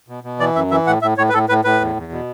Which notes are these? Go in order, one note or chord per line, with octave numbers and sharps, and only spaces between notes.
B2
B2
E3 D5
F#2 E5
E3 E5
A2 F#5
A2 E5
A2 C#5
B4
A2 A4
A2 B4
A2 B4
E2
E2
B2